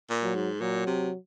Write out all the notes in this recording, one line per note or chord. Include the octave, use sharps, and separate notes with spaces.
A#2
F#3
G#2
A#2 F#3
C3